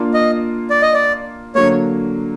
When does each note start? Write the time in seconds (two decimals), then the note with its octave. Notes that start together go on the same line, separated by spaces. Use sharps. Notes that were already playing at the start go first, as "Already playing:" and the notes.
Already playing: A#3 D4 F4
0.14 D#5
0.70 D5
0.82 D#5
0.94 D5
1.55 D3 F#3 A#3 C#5